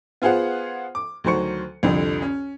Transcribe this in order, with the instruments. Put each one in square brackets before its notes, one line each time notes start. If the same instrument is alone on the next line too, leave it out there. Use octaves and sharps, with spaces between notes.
[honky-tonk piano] B3 F4 G#4 C5 F#5
D6
D2 D#3 F#3 C5 C#6 C#7
C2 F2 D3
C#4